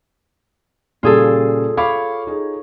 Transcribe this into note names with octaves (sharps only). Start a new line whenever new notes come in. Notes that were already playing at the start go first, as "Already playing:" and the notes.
A#2 C#3 G3 F4 G#4 A4
C#5 F5 B5 D6
D#4 G#4